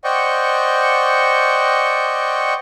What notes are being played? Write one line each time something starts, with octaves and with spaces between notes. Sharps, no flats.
C5 D5 D#5 F#5 G5 C#6